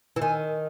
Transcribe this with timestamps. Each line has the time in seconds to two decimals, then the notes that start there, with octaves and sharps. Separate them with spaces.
0.16 E3
0.21 D#3 G#5